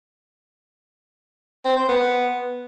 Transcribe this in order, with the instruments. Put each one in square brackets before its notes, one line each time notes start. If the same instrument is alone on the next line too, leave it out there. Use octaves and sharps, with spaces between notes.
[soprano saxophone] C4
C5
B3